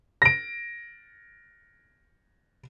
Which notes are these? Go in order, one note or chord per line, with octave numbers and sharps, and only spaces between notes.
A#6 D7